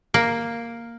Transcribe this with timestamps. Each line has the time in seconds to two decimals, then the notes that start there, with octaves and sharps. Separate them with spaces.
0.14 A#3